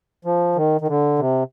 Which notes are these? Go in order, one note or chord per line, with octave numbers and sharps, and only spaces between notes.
F3
D#3
D#3
D3
C3